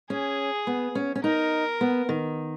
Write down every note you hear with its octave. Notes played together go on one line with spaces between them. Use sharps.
C#4 G#4
B3
C#4
C#4
D#4 A#4
B3
D#3